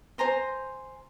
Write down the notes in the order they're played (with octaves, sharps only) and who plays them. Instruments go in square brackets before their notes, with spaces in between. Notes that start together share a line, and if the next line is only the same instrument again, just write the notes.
[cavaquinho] C5 G#5 A#5 C6